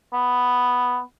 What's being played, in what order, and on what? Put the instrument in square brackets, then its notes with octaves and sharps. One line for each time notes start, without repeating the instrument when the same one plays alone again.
[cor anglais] B3